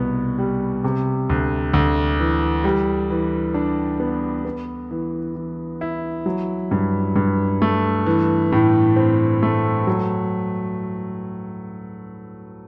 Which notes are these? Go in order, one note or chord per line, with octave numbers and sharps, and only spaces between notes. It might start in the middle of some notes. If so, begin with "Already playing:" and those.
Already playing: C2 B2 B3
G3
C3
D2
D2
E3
G3
E3
D4
B3
B3
E3
E3
E4
F#3
G2
G2
A3
E3
A2
C4
A3
F#3